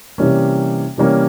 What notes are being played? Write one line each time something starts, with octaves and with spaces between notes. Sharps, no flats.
C3 E3 G3 A#3 C#4
C3 E3 G3 A#3 C#4